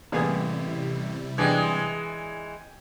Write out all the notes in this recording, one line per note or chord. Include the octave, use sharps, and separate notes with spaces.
A1 C3 G3 A#3 B3 E4 G#4
E3 G#3 B3 D4 G5 G#5 G#6